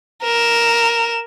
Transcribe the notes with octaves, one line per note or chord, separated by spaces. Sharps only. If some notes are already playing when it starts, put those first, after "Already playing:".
A#4 E7